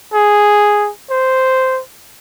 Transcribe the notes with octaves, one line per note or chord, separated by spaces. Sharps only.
G#4
C5